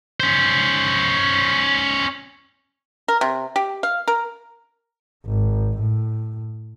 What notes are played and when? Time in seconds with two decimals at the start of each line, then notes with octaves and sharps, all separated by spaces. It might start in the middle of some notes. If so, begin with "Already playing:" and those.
0.20 C#4 C5
3.08 A#4
3.21 C3
3.56 G4
3.83 F5
4.08 A#4
5.26 G#1
5.79 A2